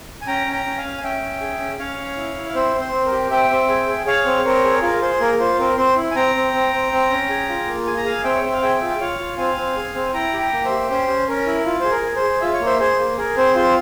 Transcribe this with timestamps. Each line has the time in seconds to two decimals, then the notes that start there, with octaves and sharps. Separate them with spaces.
0.21 G#5
0.27 C#4 G5 A#5
0.47 C#4
0.53 G5 A#5
0.66 C#4
0.78 F5 G#5
0.84 C#4
0.98 G#5
1.03 C#4 E5 G5
1.22 C#4
1.41 G#4
1.60 C#4
1.79 C#4 C#5 F5
1.99 C#4
2.17 E4
2.36 E4
2.49 F5
2.55 C4 C5 E5
2.75 C4
2.80 C5
2.93 C4
3.05 A#4
3.12 G4
3.31 C4 E5 G5
3.50 C4
3.69 G#4
3.88 G#4
4.06 G#4 C#5 F5
4.25 C4
4.45 C4 A#4 C#5
4.64 G#4
4.82 F4 A#4
5.02 G#4 C5
5.21 A#3 A#4
5.39 F4 C5
5.59 C4 A#4
5.77 C4 C5
5.96 E4
6.11 G#5
6.16 C4 G5 A#5
6.35 C4
6.53 C4
6.73 C4
6.92 C4
7.10 C#4
7.29 G#4
7.49 F4
7.67 A#3
7.87 G#4 G#5
7.97 A#5
8.05 G#4 F5 G#5
8.24 C4 E5 G5
8.35 C#5
8.43 C4 E5
8.53 F5
8.62 G#4 E5 G5
8.82 F4
8.90 G5
9.00 F4 C#5 F5
9.19 F4
9.38 C4 F5 G#5
9.58 C4
9.76 G#4
9.94 C4
10.14 E4 G5 A#5
10.34 G4
10.39 G5 A#5
10.53 A#3
10.65 C5 E5
10.71 G4
10.90 C#4 C5
11.08 C#4
11.28 C#4 A#4
11.47 E4
11.66 F4
11.80 G#4 C5
11.91 A#4
12.04 G#4
12.16 C5
12.22 G#4
12.41 F4 E5
12.53 C#5
12.61 A#3
12.66 C5 E5
12.79 G#4 C5
12.99 A#3
13.17 G#4 A#4
13.37 C4 C5
13.55 F4 C5